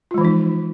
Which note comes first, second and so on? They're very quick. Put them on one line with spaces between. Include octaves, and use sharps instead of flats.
F4 G#3 E3 F3 D#4